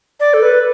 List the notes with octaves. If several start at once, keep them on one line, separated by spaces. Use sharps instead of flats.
D5
A4
B4